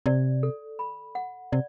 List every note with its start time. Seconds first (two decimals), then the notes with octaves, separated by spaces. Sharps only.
0.06 C3 D5
0.43 A4
0.79 B5
1.15 F#5
1.52 C3 D5